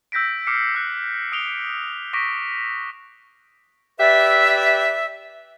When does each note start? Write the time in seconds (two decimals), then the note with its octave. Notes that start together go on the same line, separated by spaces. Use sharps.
0.12 E6 G6 A#6 B6 D7
0.47 D6 F6 C7 C#7
0.75 E6 F#6
1.32 D#6 D7 F7 G7
2.13 C#6 D6 A#6 B6 D7
4.00 G4 B4 D5 E5